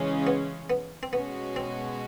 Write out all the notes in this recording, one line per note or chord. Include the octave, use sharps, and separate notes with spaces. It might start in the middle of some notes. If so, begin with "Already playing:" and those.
Already playing: C#3 E3 G#3 C#4
B3
B3
C4
B2 G#3 B3 C#4 F#4
C4